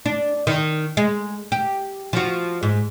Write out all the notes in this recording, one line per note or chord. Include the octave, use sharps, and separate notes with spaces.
D4
D#3
G#3
G4
F3 F#4
G#2